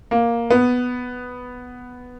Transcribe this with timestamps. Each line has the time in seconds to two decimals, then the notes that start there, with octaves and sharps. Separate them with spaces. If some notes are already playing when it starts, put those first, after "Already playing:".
0.11 A#3
0.50 B3